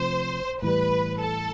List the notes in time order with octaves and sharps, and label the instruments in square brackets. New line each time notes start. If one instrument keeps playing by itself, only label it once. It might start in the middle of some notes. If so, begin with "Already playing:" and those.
Already playing: [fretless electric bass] C3 F3 A3 [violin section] C5
[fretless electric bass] A2 E3 G3 [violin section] B4
[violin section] A4